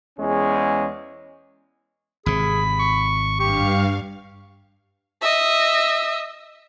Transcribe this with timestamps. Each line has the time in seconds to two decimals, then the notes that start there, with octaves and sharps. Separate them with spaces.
0.18 E2 G#3 C#4
2.26 G#1 C3 G#4 B5
2.80 C#6
3.40 G2 G4 F5 C#6
5.22 D#5 E5